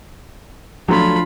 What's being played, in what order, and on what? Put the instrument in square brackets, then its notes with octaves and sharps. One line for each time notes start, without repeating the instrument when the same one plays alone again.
[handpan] F3 D4 [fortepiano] F#3 A3 [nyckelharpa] F4 B5